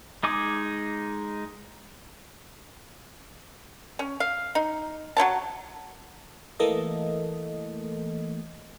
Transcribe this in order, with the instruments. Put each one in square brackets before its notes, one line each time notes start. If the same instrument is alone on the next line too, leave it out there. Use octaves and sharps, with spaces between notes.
[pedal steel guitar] G#3 D#4 G#4 D6
[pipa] C#4
F5
D#4
F#3 E4 C#5 A5
[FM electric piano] E3 A3 A#3 A4 D#5